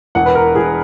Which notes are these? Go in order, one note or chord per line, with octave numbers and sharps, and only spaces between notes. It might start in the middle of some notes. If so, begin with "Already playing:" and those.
E1 F#5
B4
A#4
E1 G#4